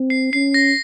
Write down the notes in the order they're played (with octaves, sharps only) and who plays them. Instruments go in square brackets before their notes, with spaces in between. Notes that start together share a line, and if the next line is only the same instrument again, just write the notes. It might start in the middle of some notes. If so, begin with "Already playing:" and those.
Already playing: [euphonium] C4
[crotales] C7
[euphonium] C#4 [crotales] C7
[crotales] A#6